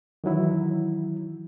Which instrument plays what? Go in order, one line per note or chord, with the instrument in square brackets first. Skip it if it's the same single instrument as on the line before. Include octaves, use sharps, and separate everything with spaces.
[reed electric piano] D#3 E3 F#3 E4